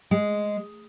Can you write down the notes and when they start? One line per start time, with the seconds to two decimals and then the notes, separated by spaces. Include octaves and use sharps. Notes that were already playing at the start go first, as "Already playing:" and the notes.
0.11 G#3